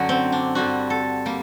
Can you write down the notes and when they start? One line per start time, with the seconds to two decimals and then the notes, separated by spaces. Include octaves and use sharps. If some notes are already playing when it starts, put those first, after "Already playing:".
Already playing: F#2 D3 F#3 F#4
0.09 C4
0.32 D4
0.55 G2 D3 G3 F#4
0.90 A4
1.26 G3 A#3